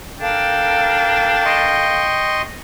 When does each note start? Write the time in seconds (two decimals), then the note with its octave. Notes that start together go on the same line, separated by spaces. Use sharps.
0.19 D4 A4 A#4 F5 G5
1.45 D#5 C6 C#6